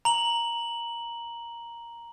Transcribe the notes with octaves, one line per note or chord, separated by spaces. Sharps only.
A#5 F#7